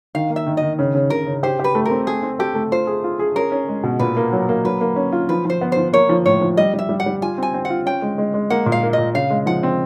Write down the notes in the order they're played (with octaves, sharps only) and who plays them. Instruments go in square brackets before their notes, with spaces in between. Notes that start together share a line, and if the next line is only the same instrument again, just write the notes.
[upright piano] D#3 [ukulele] F5
[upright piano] A#3
[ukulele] E5
[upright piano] D#3
[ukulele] D#5
[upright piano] D#3
C#3
C#3
[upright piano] C#3 [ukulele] A#4
[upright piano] C#3
[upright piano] G4 [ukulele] C5
[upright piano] G4 [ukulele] B4
[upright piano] A3
[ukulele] A#4
[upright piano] C4
[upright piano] A3 [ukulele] G#4
[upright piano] C4
[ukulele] G4 [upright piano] A4
[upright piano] A3
[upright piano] F4 [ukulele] C5
[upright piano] G#4
F4
G#4
[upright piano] C#4 [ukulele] A#4
[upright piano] C#4
G#3
B2
[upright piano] A#2 [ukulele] B4
[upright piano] A#3
F#3
A#3
[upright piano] F#3 [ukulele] B4
[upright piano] A#3
C#4
F4
[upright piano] F3 [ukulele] B4
[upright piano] F3 [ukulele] C5
[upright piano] B3
[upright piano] F3 [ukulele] C5
[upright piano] A#3 [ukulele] C#5
[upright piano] F3
[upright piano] A2 [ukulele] C#5
[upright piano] F3
[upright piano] G3 [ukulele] D#5
[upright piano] G3
[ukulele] E5
[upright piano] G3
[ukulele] F#5
[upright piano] G3
[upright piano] F4 [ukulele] G#5
[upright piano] C4 [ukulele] G#5
[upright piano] C4
[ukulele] F#5
[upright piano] F4
[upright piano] C#4 [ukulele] G5
[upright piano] G#3
G#3
G#3
[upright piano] A#3 [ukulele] F#5
[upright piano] A#2
[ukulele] F5
[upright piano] A#3
[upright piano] A#2 [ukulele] D#5
[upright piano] C#3 [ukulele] F5
[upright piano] G#3
[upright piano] F3 [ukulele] F#5
[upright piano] C4